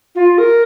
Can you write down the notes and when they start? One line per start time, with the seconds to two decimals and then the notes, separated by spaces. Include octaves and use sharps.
0.15 F4
0.38 A#4